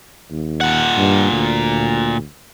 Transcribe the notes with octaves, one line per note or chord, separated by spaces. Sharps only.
D#2
A#2 F#5
G2
D2